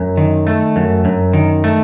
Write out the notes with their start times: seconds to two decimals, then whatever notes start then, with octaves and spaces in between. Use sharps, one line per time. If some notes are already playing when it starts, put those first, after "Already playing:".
Already playing: F#2
0.17 D#3
0.47 A3
0.76 F#2
1.05 F#2
1.33 D#3
1.64 A3